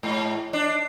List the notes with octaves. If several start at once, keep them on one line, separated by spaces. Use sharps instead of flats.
G#2
D4